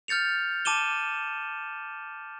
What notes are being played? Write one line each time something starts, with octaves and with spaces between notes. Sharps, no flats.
F6 G6 A6 C#7 F7
A5 D6 D#7 E7 G7